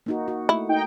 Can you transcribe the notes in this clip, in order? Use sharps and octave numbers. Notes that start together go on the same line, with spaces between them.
A#3 D#4 F#4
F#4
A3 E4
D#4 G5